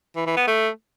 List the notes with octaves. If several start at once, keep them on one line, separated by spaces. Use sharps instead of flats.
E3
E3
B3
A3